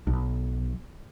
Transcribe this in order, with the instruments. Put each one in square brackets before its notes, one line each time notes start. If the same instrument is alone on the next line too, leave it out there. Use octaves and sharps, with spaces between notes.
[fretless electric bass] B1